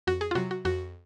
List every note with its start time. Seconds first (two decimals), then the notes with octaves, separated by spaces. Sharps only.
0.07 F2 F#4
0.21 G#4
0.31 F4
0.35 C3 F#3 F#4
0.51 F#4
0.65 F2 F#4